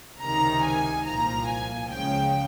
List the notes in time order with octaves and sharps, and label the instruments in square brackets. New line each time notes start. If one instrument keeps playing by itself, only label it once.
[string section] C#2 C3 D#3 A#5
G#5
C2 A#2 F3 A#5
G#5
C#2 C#3 F3 G5